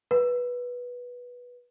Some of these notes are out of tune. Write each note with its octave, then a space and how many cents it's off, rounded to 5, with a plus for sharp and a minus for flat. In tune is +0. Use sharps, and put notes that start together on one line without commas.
B4 -15